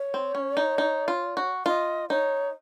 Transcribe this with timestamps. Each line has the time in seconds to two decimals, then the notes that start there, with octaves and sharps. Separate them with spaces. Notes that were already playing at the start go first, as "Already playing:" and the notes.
Already playing: C#5
0.14 C4
0.35 C#4
0.57 D#4
0.78 D#4
1.08 F4
1.37 F#4
1.66 F4 D#5
2.10 D#4 C#5